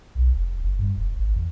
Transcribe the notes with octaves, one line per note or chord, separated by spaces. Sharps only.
B1
F1
F#1
G2
F1
G#1
E2